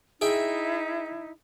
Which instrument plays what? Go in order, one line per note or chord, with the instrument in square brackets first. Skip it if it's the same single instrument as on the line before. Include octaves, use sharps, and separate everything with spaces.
[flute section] D#4 E4 [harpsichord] G#4 E5 G5